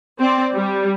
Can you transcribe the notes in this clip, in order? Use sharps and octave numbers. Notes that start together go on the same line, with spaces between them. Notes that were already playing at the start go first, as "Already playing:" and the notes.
C4 D5
G3